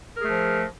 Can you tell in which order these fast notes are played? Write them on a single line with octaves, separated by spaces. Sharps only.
A#4 G#4 A3 F3